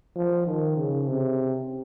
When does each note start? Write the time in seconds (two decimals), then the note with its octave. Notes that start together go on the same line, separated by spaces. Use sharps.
0.16 F3
0.46 D#3
0.76 C#3
1.07 C3